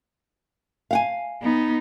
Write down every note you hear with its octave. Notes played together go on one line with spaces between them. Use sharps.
F5 F#5 G#5
B3 D#4